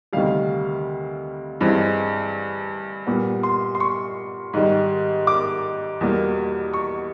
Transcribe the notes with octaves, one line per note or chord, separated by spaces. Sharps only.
D2 C3 D#3 G3 F5
G2 E3 G#3 C4
A#2 G3 B3
C6
C6
C#6
G#2 D#3 G3
D6
E2 B2 G3 A#3
C#6